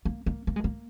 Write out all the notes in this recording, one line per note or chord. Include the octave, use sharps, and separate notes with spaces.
A#3
A#3
A#3
G#3
A#3